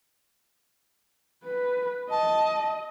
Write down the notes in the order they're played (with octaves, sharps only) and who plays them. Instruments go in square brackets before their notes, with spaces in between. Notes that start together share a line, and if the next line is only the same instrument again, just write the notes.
[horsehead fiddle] B4
[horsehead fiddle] D#5 [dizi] A5